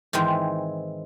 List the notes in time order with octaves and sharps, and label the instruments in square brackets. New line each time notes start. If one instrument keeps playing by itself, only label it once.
[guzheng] G#2 D#3 E3 G#3 C4